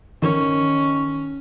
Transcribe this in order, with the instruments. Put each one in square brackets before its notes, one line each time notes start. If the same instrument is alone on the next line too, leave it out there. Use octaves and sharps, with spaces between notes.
[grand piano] D#3 [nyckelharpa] C#4